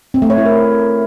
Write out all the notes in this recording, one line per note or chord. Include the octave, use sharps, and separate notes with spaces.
C4
A3
C#5
E4
A#4